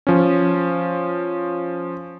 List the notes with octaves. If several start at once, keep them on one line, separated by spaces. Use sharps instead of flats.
F3 C#4